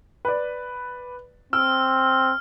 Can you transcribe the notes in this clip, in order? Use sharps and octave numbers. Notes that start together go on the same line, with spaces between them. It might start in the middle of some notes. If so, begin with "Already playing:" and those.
B4 D5
C4 E6 F6